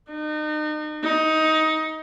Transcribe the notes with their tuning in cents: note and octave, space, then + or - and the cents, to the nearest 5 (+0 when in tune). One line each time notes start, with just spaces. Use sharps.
D#4 -35
D#4 +15